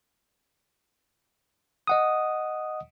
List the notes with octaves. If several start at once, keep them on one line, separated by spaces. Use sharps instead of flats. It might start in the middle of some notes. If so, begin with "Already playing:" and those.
D#5 F#5 D#6